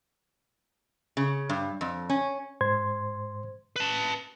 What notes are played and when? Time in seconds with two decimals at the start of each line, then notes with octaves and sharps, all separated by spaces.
1.17 C#3
1.49 G2
1.81 F2
2.10 C#4
2.61 G#2 C5 C6 G#6
3.76 B4 A5